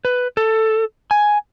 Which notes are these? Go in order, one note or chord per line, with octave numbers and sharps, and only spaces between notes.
B4
A4
G#5